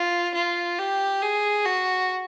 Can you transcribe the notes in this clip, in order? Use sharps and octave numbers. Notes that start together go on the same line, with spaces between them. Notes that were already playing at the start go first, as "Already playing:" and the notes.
Already playing: F4
F4
G4
G#4
F#4